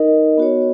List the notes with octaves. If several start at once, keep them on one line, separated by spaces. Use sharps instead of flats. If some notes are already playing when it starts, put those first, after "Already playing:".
Already playing: D#4 A#4 D#5
B3 F#4 C#5